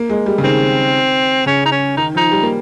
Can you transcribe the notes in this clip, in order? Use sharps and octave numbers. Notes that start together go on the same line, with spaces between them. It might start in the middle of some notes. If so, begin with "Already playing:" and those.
Already playing: A#3
G#3
G3
C#3
D#3 C4
C#3 C#4
D#4
C#4
D#3 D#4
F3 D#4
G3
A#3